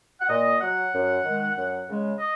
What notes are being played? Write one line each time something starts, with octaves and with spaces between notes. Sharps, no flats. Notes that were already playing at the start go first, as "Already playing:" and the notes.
F#5
A#2 D#5
F#3 F#5
F#2
D#3 G#3
F#2
C#3 G#3
D#5